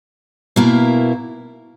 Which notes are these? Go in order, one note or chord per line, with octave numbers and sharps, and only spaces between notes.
B2 A#3 E4 A#4